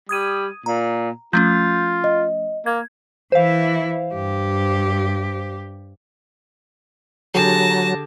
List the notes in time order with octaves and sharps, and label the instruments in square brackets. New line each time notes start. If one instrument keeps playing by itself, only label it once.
[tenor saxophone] G3 [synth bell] D#6 G#6 D#7
[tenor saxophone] A#2 [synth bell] A#5
[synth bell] F3 A3 C#4 [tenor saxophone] F4 [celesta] G6
[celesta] D#5
[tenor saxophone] A#3 [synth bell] G#6
[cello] E3 E4 [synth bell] C5 F5
[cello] G2 G4
[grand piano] D3 G4 G#4 [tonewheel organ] F#3 [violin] A5 A#6